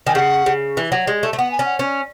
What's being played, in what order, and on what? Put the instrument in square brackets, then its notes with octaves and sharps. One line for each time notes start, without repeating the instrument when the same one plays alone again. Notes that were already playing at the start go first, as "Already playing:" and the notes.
[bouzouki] D#3 [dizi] G#5
[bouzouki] C#3 [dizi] F#5
[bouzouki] C#3
E3
F#3
G#3
A3
A3
[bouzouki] B3 [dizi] F#5
[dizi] G#5
[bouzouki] C#4
[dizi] F#5
[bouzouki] C#4